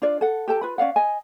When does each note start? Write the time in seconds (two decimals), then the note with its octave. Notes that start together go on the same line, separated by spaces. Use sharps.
0.02 D4 F4 D5
0.21 A4 F#5
0.48 G4 A4 G5 A5
0.61 F4 B4 B5
0.78 C#4 D5 F5 F#5
0.96 D#5 G#5